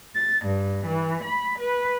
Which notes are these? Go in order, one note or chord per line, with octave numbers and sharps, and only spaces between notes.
A6
G2
E3
B5
B4